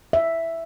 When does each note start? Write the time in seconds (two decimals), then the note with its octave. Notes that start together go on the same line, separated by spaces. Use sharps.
0.13 E5